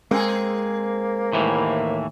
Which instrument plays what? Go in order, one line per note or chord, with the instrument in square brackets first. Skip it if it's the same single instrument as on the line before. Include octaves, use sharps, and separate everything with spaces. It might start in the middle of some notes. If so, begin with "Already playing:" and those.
[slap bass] G#3 [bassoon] A#3 [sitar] C4 G#4
[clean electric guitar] D#2 A2 E3